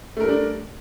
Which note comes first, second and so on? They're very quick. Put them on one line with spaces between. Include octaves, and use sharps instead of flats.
A3 A#4 G3 D4